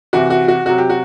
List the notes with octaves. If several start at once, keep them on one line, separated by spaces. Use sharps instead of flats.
C3 E3 F#4
F#4
F#4
C3 F#3 F#4
G4
F#4